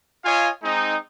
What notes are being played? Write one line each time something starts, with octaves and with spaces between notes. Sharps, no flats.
F4 C#5 D#5 F5 G#5
G#3 C4 D#4